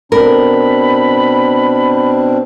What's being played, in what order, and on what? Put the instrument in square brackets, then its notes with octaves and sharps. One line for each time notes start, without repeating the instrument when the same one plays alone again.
[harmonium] B2 C4 D4 [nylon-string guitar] A#4 [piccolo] B5